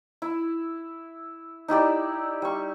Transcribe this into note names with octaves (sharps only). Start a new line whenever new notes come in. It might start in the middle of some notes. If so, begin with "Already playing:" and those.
E4
D#4 E4 G4 D5
G3 C#6